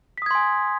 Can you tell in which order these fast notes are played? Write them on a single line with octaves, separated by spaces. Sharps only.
B6 D#6 G#6 C6 G#5